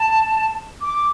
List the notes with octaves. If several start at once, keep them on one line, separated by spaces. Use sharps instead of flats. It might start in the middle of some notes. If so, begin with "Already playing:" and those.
Already playing: A5
D6